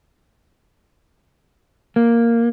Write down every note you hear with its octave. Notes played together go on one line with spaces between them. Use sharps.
A#3